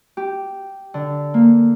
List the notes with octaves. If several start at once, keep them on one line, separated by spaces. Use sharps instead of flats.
G4
D3
A#3